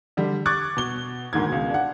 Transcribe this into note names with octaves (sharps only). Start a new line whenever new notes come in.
D3 G3
C#6 D6 F#6 G#6 A6
B2 G7
D2 G#2 D#3 G#6
C#2 B2
D4 F#5